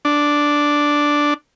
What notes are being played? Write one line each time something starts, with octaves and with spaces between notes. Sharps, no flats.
D4